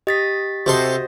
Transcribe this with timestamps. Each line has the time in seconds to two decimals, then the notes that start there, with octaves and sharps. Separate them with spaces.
0.07 G4 D#5 A6 B6
0.66 C3 F#4 A4 C5 D#5 C6